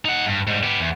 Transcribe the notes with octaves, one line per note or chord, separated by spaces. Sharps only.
D#4 F#5
G2
G#2 G3
B3 G4
E2